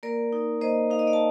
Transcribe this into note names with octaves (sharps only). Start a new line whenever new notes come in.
A#3 A#4 D5
D#4
A#3 C5 D#5
D#4 F5
D#5
D5 F5
A5